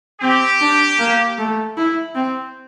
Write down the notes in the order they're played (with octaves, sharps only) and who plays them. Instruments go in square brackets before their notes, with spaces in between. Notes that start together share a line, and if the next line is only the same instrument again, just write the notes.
[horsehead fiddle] C4 [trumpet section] G4
[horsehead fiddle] D4
A#3
A3
E4
C4